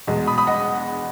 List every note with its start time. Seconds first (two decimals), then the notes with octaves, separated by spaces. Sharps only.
0.07 E2 B2 G#3
0.27 B5 D#6
0.38 B5 D#6
0.47 D#5 F#5